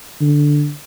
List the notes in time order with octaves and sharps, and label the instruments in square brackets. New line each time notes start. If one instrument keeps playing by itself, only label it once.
[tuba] D3